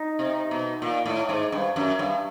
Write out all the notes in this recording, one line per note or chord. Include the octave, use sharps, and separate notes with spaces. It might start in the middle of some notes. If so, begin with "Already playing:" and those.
Already playing: D#4
C3
B2
A#2
A2
G#2
G2
F#2
G2